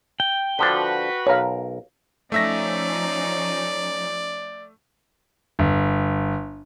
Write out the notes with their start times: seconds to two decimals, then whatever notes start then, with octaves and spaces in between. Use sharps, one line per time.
0.20 G5
0.59 D3 F3 D4 F#4 B4
1.27 B1 A#4 C#5 F5
2.32 F3 A3 C#4 D#4 D5 E5 A#6
5.59 G1